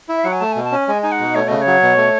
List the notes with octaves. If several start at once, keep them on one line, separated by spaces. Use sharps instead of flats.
E4
E5
F#3 F#5
G#5
A3 A5
B2 G#5
A5
C#4 G#5
G#3 G#5
D#4 G#5
F#5
B2
A3 C#5
C#3 D#5
C#5
F#3
B2
A3